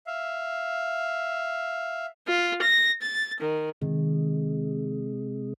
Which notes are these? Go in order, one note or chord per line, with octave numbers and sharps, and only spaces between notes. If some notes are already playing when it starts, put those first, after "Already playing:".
E5 F5
F4
A#6
A6
D#3
C3 D#3 G#3